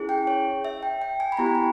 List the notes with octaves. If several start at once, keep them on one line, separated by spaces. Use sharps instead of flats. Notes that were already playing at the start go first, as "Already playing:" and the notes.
Already playing: C#4 E4 G#4
G5
C#5
E5
G5
G5
G#5
B5
B3 E4 G4 A#5
G5
G#5